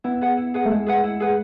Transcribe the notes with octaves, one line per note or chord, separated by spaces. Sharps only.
B3 E4
G#4 B4 F#5
E4
G#4 B4 F#5
A3
G#3 E4
G#4 B4 F#5
E4
G#4 B4 F#5